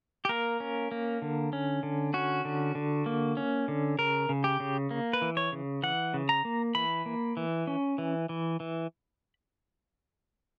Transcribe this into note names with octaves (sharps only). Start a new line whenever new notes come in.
G4
A#3 A#4
C#4
A#3
D3
C#4
D3
C#4 F#4
D3
D3
A#3
C#4
D3
C#3 A#4
C#3
G4
C#3
A#3
B4
E3
C#5
C#3
E3 F#5
C#3
A#5
A#3
E3 B5
A#3
E3
C#4
E3
E3
E3